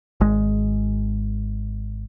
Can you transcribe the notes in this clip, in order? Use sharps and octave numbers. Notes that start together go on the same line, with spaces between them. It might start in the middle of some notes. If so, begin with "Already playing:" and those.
G#1 G#3